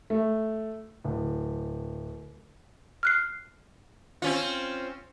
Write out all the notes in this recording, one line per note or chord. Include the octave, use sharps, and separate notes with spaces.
A3
D1
F6 F#6 C7
C4 C#4 F4